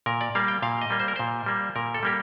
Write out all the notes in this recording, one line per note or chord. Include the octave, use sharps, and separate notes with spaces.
A#2 A#4
D5
G3 A#3 F5
G5
A#2 F5
D#5
G3 A#3
C5
A#4
A#2 C5
G3 A#3
A#2 A#4
A4
G3 A#3 G4